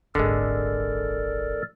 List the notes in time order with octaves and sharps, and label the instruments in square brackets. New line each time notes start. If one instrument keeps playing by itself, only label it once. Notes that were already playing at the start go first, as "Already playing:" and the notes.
[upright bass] D#1 G#1 [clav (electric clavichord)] D3 G#3 [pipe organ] A4 A#4 D5